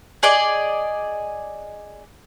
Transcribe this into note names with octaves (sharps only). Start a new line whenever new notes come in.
G#4 D5 D#5